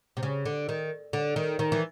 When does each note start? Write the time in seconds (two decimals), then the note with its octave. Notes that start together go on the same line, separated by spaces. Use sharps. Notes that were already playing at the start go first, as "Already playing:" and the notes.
0.17 C3
0.23 C#3
0.45 D3
0.69 D#3
1.13 D3
1.36 D#3
1.59 D#3
1.72 E3